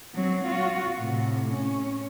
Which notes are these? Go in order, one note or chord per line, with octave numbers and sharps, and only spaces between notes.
F#3 C4
F4 F#4
A2 C3
C#4